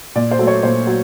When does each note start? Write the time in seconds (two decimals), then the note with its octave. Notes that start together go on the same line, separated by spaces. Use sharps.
0.16 A#2 D5
0.31 C5
0.39 F#3 A3
0.47 C#5
0.63 A#2 C5
0.87 F#3